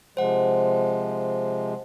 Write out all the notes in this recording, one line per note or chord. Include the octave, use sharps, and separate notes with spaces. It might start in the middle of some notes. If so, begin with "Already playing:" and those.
C3 F3 G#3 C5 F#5